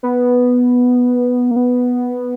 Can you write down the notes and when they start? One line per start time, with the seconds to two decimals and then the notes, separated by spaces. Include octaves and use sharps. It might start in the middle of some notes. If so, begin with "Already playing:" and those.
0.03 B3
1.51 A#3
1.56 B3